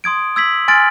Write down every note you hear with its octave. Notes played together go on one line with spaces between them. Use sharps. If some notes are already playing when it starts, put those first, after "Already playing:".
C6 D#6 G#6 D7
E6 G#6 B6 F#7
G#5 C6 F6 A6 D7